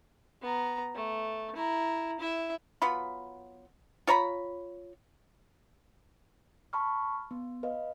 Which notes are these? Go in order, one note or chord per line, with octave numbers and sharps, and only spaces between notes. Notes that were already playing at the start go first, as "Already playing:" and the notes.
B3 A#5
A3
E4 A#5
E4 E5
F#3 B3 F4 B5
F4 C#5 A#5 B5
A5 B5 C#6 F6
B3
B4 D#5 F5